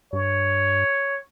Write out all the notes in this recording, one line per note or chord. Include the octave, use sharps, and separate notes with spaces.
G2 C#5